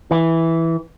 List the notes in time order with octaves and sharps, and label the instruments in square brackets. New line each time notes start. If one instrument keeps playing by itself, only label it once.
[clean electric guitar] E3